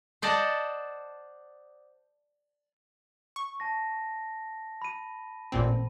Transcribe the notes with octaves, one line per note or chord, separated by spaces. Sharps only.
C5 D5 D#5 F#5 A5
C#6
A5 A#6
B5 D#7
A1 A#2 C4